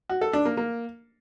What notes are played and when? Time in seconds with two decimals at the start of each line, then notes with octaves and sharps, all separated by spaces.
0.09 F#4
0.21 A4
0.33 D4
0.45 A#3
0.57 A#3